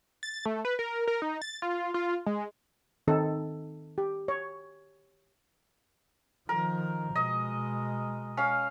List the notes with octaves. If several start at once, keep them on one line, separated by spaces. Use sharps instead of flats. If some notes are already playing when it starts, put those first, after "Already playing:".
A6
A3
B4
A#4
A#4
D#4
A6
F4
F4
G#3
D#3 C4 D#4 A4
G4
C#5
D#3 F3 A#4
B2 G#3 D#5
C#4 F5